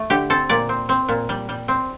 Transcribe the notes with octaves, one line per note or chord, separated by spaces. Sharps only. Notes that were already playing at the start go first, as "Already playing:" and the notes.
Already playing: A3
D3 G4
C4 A4
A#2 D5
C4
C4
A#2
G3
G3
C4